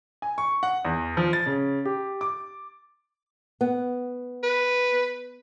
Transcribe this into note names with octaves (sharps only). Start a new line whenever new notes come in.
G#5
C#6
F#5
E2
F3
A6
C#3
G4
D6
B3
B4